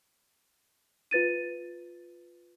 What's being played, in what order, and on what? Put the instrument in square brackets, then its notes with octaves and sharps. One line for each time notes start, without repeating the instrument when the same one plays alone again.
[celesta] F4 B4 A6 D#7